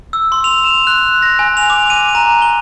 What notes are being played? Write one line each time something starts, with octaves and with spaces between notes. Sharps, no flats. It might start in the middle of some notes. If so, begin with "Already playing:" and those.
E6
C6
F7
E7
F#6
A#6
G#5
F7
D6
D#7
A#5
G7